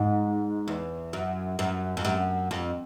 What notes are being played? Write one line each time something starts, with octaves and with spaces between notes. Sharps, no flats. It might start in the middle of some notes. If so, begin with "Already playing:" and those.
Already playing: G#2
E2
F#2
F#2
F2
F#2
F2